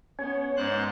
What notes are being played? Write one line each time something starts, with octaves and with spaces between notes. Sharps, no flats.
B3 C#4 C#5
G#2 B3 C5 D5 F#6